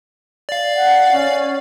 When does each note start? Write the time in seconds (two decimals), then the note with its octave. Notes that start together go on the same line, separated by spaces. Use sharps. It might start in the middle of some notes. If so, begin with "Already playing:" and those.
0.49 D5 F5
0.75 F#5
1.12 C#4